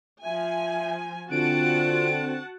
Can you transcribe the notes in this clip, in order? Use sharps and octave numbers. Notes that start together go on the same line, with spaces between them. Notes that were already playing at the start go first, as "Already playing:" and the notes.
F3 E5 G#5
D3 C4 F4 F#4 F#5 A5 D7